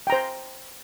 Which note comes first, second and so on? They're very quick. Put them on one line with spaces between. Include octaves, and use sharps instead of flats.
G5 A#5 C5